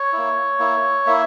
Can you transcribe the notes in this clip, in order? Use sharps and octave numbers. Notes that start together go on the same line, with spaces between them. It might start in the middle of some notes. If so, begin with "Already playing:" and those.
Already playing: C#5
A#3 E4
A#3 E4
A#3 E4 E5